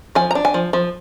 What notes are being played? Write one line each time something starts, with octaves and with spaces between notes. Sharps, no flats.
F3 G#5
A#5
D4
G#5
F3
F3